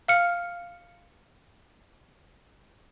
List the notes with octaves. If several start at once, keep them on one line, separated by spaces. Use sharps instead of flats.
F5 F6 C#7